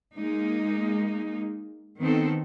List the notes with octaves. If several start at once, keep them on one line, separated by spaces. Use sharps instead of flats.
G#3 A#3 D#4
D#3 B3 C4 D#4 A4